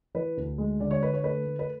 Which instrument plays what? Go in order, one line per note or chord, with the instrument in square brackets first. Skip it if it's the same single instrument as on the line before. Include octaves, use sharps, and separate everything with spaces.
[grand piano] E3 B4
D2
G#3
D3 D5
C#5
D3 B4
C#5
A3 B4
A3
B4